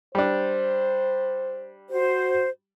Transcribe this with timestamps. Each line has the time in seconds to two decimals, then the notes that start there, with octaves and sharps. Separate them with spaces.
0.15 G3 D4 C5
1.91 F#4 C5